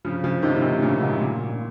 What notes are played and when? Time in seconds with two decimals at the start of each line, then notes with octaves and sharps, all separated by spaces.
0.05 C#3 F3
0.24 C#3 F3
0.42 C3 D#3
0.62 C3 D#3
0.82 A#2 C#3
1.00 G#2 C3
1.21 A#2
1.49 A#2